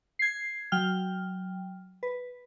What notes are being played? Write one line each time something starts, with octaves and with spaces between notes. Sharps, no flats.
G#6 C7
F#3 G5 F6
B4